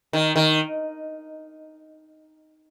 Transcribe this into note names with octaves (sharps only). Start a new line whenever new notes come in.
D#3
D#3